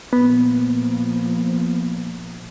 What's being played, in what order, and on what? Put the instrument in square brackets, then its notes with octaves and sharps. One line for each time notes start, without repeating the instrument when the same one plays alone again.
[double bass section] A#2 F3 A#3 [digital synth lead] B3